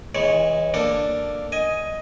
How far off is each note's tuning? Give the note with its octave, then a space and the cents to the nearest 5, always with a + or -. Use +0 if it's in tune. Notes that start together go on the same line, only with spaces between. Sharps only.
E3 -25 G#3 +0 C#5 -10
A#3 +0 D4 +5 A4 +0
D#5 +10 G#5 +0